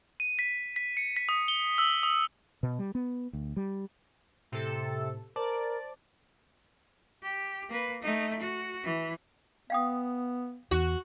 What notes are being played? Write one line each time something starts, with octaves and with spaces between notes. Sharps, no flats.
D#7
B6
B6
C#7
B6
D#6
G7
E6
D#6
B2
G3
B3
D2
G3
A2 C3 A4
A#4 C5 D5 A5 D6
G4
A#3 B4
A3 D#4
F#4
E3
B3 F5 G5 D#6
E2 F#4